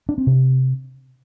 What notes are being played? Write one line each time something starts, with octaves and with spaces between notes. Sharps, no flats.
D4
C4
C3